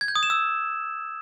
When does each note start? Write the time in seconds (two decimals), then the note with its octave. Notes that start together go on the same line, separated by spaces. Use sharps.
0.01 G#6
0.08 G6
0.16 D#6
0.23 E7
0.30 E6